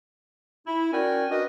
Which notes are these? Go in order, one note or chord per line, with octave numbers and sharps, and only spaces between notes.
E4
C#4 F#4 A#4 D5 G5 G#5
D4 F#4 A#4 B4 D#5